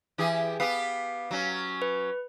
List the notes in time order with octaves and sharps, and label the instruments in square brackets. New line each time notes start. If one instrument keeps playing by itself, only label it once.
[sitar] E3 G4 G#4
[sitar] B3 G4 [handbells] F5
[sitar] F#3 C#4
[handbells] B4